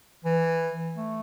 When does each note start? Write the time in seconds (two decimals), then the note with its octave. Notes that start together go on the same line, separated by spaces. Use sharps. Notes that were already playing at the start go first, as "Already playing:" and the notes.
0.24 E3
0.96 A3